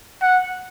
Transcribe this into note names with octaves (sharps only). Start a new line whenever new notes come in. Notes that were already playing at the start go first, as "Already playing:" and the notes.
F#5